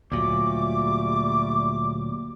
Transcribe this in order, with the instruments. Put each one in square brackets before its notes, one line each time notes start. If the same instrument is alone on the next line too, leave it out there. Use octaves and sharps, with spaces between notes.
[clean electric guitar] D2 A#2 F#3 [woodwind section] G3 A3 D6